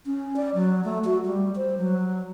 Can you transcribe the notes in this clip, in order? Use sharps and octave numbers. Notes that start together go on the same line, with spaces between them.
C#4
D5
F#3
A3
F#4
G3
C5
F#3